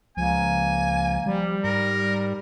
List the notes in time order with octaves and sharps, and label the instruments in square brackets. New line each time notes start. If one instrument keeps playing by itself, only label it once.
[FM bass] C#2 [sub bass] F3 [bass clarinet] A#3 [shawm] G#5
[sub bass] F3 [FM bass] G3
[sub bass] G#2 [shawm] A#4